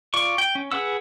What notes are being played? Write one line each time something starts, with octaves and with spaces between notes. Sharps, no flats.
F4 D5 C#6
G5
C#4
G#4 B4 F#5 E6